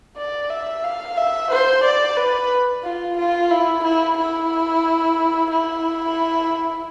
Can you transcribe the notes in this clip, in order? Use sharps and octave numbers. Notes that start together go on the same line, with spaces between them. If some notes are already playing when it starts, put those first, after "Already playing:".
D5
E5
F5
E5
C5
D5
B4
F4
F4
E4
E4
E4
E4